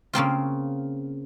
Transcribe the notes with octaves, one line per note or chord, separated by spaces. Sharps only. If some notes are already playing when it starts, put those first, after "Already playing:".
C#3 A#3 C4 F4